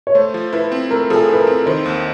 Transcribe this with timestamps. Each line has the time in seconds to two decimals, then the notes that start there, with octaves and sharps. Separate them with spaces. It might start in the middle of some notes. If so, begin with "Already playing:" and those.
0.07 C#5
0.15 A3 C5
0.34 F3
0.53 E4 B4
0.72 C4
0.91 A3 A#4
1.10 F3 A4
1.16 G#4
1.29 E4 B4
1.41 A#4
1.47 C4
1.66 D#3 C5
1.86 D#2